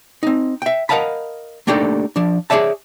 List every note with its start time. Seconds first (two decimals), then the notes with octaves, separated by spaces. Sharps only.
0.23 C4 D#4
0.62 E5 G5
0.89 A#4 D#5 F5 F#5 A5 B5
1.67 A3 A#3 D4 D#4 G4 A4
2.16 F3 D4
2.50 G#4 A4 C#5 D5 E5 A5